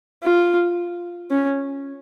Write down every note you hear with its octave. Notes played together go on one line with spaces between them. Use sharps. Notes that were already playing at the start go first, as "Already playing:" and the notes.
F4
C#4